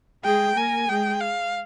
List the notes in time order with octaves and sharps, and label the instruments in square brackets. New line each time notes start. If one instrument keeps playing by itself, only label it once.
[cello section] G#3 G#4 [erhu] G5
[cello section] A#3 A#4 [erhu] G#5
[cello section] G#3 G#4 [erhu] G5
[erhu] F5